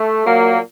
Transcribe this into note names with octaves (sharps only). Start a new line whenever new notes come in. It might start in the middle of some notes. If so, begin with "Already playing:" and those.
Already playing: A3
A#2 F#3 A#3